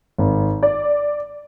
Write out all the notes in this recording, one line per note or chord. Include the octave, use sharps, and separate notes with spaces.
G#1
D5